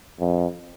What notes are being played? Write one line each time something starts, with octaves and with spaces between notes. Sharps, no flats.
F2